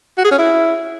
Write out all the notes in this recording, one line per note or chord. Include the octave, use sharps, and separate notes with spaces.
F#4
G#4
C#4
E4